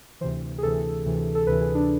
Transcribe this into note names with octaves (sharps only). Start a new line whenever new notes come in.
D2 C3 E3 C5
G#4
D2 C3 E3 A4
D2 C3 E3
A4
D2 C3 E3 B4
G#4
D4